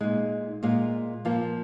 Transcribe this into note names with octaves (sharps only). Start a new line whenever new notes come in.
A#2 G#3 D#4
A#2 G#3 F4
A#2 F3 A#3 F4